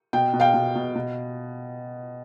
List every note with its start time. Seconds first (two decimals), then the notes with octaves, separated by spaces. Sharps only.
0.13 B2 G5
0.33 B2
0.40 F5 G5
0.54 B2
0.75 B2
0.95 B2